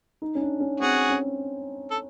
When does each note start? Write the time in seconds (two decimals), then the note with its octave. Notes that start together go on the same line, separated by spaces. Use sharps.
0.22 D#4
0.35 C#4
0.41 D4
0.60 C#4
0.80 C4 F#4 G#4
1.09 C#4
1.91 A4